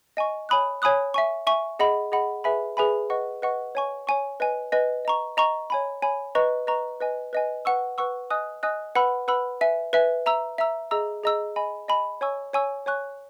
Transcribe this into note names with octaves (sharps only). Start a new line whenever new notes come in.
D#5 G#5 C#6
C#5 G#5 B5 D#6 F#6
C#5 G#5 B5 D#6 F#6
E5 G#5 C#6
E5 G#5 C#6
G#4 D#5 F#5 B5
G#4 D#5 F#5 B5
G#4 B4 E5 G#5 B5
G#4 B4 E5 G#5 B5
B4 D#5 F#5 C#6
B4 D#5 F#5 C#6
C#5 G#5 C#6
C#5 G#5 C#6
B4 D#5 G#5
B4 D#5 G#5
D#5 A#5 C#6
D#5 A#5 C#6
C#5 G#5 B5
C#5 G#5 B5
B4 D#5 A#5 C#6
B4 D#5 A#5 C#6
B4 D#5 G#5
B4 D#5 G#5
B4 F#5 C#6 E6
B4 F#5 C#6 E6
D#5 G#5 D#6 F#6
D#5 G#5 D#6 F#6
B4 F#5 B5 E6
B4 F#5 B5 E6
B4 E5 G#5
B4 E5 G#5
E5 A#5 E6
E5 A#5 E6
G#4 D#5 A#5 E6
G#4 D#5 A#5 E6
D#5 G#5 B5
D#5 G#5 B5
C#5 G#5 C#6 E6
C#5 G#5 C#6 E6
C#5 G#5 C#6 F#6